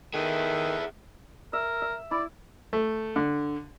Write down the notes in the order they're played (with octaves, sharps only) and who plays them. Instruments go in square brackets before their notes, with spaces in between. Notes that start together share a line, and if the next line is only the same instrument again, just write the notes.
[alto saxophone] D#3 [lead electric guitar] E4 G#4 [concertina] A4 B4 E5
[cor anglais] A#4 [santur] E5
[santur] E5
[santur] E4 [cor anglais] D5
[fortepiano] A3
D3